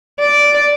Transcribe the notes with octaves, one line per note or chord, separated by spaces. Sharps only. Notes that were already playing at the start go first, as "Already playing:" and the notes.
D5